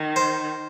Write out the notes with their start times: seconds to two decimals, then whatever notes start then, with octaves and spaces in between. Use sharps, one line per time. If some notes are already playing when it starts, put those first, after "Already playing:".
Already playing: D#3
0.16 C5